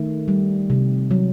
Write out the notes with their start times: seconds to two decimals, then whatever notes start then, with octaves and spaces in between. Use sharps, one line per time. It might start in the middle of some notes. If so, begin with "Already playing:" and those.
Already playing: D#3 A3
0.28 G3
0.70 C3
1.11 F#3